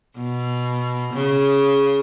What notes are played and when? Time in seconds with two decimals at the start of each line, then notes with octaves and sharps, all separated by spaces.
0.17 B2
1.13 C#3